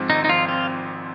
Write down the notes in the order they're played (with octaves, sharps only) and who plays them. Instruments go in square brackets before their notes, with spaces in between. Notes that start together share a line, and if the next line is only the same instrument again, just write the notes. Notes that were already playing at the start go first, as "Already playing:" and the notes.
Already playing: [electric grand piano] G#2 F3 C4
[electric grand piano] G#1 [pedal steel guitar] D#4
[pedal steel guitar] D#4
[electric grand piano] F3 [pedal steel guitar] F4
[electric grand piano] C4 [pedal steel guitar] F4